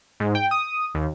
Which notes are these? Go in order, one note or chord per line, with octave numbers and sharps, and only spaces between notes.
G#2
G5
D#6
D#2